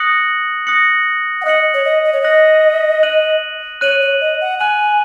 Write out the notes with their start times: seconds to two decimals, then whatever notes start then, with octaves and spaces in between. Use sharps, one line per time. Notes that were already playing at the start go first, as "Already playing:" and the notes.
Already playing: D#6 F#6 A#6 C#7 F#7
0.67 D#6 F#6 A#6 C#7 F#7
1.41 F#5
1.45 D#5 D#6 F#6 A#6 C#7 F#7
1.74 C#5
1.85 D#5
2.05 D#5
2.13 C#5
2.21 D#5 D#6 F#6 A#6 C#7 F#7
3.03 F#6 D#7 F#7
3.81 C#5 F#6 D#7 F#7
4.01 C#5
4.21 D#5
4.41 F#5
4.60 G#5 F#6 D#7 F#7